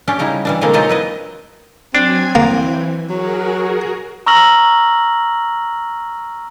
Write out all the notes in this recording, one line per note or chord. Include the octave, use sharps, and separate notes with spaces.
C#4 D4 G4
C#3 G3 D#4 E4
E3 G3 D4
B2 D3 G#3 A#3 C4
F#3 C4 D#4 F4 C5 D#5
E4 B4 D#5
F#3 C4 D4 G#5 G#6
E3 A#3
F#3 F#4 G#4 A#4
A#5 C#6 E6 F6 A#6 F#7